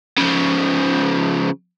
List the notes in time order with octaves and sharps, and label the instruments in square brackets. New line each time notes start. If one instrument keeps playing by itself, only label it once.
[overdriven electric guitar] C#3 F3